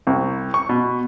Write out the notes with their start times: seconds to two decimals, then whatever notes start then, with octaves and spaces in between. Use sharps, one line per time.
0.07 C2
0.54 C#6
0.69 B2